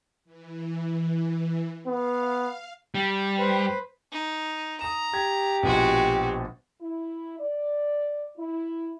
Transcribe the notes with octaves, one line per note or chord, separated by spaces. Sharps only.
E3
B3 F5
G3
B4 C5
D#4
A#5 D#6 E7
G4 G#6
A#1 B2 G#3 F#4
E4
D5
E4